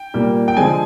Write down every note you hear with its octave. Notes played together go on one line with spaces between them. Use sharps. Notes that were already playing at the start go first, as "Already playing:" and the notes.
Already playing: G5
A#2 G3 A#3
G5
D3 F3 G#3 C4 G#5